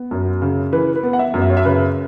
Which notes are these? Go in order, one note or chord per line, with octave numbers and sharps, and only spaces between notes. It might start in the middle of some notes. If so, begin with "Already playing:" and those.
Already playing: B3
F#2
C#3
E3 B4
B4
B3
F#5
E5
F#2
E5
C#5
E5
C#3 B4